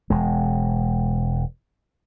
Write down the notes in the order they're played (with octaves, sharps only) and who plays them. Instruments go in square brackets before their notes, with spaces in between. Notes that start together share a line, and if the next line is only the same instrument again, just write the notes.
[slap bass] E1 G#3